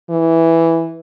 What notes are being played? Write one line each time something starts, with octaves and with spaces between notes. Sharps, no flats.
E3